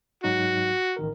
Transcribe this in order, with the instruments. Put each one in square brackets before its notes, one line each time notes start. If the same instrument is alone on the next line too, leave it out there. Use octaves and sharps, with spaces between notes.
[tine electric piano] G#2 F#3 D#4 [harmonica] F#4
[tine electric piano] A1 D#3 A#4